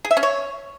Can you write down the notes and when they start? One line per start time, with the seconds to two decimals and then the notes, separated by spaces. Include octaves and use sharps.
0.05 G#4
0.11 E5
0.17 C#4
0.23 C#5